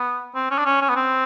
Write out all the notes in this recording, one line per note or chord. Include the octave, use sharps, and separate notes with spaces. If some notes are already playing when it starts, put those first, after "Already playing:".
Already playing: B3
C4
C#4
D4
C#4
C#4
B3
C4